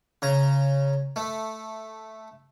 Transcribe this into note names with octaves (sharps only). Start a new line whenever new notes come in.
C#3 A#5
A3